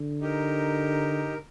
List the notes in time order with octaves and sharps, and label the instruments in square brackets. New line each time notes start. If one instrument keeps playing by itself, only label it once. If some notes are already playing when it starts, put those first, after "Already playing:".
Already playing: [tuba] D3
[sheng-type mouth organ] D#4 G4 A#4